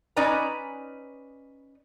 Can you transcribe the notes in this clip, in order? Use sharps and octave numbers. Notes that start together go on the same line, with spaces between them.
C#4 D#4 B4 D5 G#5 A#5